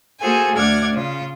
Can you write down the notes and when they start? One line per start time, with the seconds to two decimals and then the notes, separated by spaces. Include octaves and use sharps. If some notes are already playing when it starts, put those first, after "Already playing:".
0.20 A#3 F#4 G#4 A4 C5 G#5
0.55 D2 D5 F#5 F6 G#6
0.92 C#3 F4